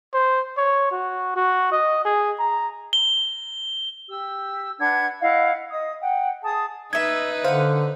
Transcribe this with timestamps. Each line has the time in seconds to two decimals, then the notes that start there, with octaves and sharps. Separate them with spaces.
0.14 C5
0.58 C#5
0.91 F#4
1.36 F#4
1.72 D#5
2.05 G#4
2.39 A#5
2.93 G7
4.09 G4 E6
4.78 D4 B4 F#5 G#6
5.20 E4 D#5 F5 F#5
5.71 D#5 D#6
6.01 F#5 G5
6.43 G#4 A5 D#6
6.93 D#4 B4 D#5 E5 G#6
7.44 D3 C5 F5 F#5